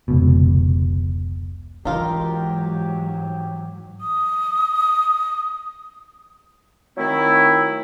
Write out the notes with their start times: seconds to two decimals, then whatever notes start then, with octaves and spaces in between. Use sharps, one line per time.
0.08 F1 C#2 B2
1.85 G#2 E3 F#3 D#4 F4 G4 A#4
4.01 D#6
6.97 D#3 F#3 A3 C4 E4